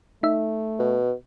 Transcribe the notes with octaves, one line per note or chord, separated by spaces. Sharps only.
A3 D#4 E5
B2